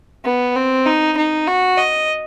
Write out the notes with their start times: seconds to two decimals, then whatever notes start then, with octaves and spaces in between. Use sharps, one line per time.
0.25 B3
0.55 C4
0.86 D#4
1.17 D#4
1.47 F#4
1.77 D#5